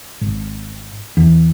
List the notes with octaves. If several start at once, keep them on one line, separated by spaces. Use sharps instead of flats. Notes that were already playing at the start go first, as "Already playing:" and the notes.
G#1
E2